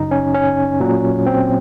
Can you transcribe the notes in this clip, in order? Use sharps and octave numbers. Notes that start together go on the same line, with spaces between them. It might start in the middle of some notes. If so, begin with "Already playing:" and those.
Already playing: F#2 C#3 F#3 D#4
C#4
C#4
A#2 F#3
C4